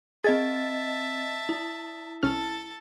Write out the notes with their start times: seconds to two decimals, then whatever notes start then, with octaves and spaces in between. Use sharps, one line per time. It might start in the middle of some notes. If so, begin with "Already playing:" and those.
0.24 C4 G#4 D#5 E5 A5 G#6 A6
1.49 E4
2.23 C2 C#4 A4 A5 F6